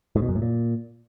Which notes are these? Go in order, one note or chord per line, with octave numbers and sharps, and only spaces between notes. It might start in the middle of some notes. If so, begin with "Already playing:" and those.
G#2
B2
F#2
A2
A#2